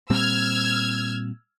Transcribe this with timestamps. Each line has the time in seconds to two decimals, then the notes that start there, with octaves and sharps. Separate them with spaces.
0.10 A#2 G3 C4 E6 F6 G#6